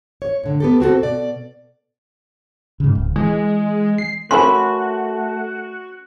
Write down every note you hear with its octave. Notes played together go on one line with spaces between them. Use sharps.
C#5
A2 D3
B3 G4 A4
C4 F#4 G#4 A4
B2 D5
G#2 C#3
D1
E3 G#3
C7
A3 C#4 F#4 A#4 B5 C6